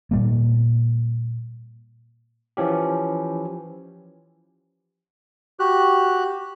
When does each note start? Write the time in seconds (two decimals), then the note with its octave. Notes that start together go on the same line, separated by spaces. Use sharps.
0.11 A#2 G3 A#3
2.57 E3 F3 C#4 G4
5.60 F#4 G4 F#6